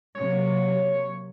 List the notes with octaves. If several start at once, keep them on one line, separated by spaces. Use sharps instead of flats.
C3 F#3 A#3 C#5